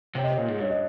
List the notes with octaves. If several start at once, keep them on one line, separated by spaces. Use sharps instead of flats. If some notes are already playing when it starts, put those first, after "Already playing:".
C3 C#5
D#5
A#2 C#5
G#2
G2 C#5
D#5